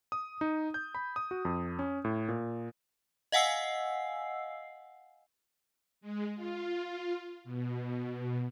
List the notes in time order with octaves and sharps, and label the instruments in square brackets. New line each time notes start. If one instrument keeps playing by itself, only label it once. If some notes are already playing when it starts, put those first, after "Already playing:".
[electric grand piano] D#6
D#4
G6
B5
D#6
F#4
F2
C#4
A2
A#2
[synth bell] D#5 F5 F#5 G#5 E6 C7
[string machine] G#3
F4
B2